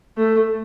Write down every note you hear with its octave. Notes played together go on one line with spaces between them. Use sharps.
A3